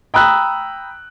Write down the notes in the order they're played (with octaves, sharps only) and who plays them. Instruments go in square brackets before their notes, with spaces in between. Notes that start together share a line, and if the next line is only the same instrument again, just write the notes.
[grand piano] G5 A#5 B5 D#6 E6 F#6